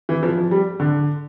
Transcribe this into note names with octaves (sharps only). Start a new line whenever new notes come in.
E3
F3
F3
G3
D3